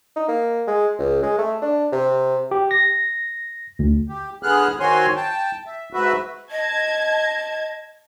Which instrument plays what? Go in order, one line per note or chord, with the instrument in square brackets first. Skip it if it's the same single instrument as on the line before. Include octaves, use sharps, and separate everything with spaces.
[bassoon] D#4
A#3
G#3
C#2
G#3
A3
D4
C3
[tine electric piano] G4
A#6
D2
[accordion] G4
D3 B3 G#4 F6 F#6
D#3 C4 F#4 C#5 G#5 C6
G5 A5
E5
G#2 F#4 B4 E5
[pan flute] D#5 [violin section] A5 G#6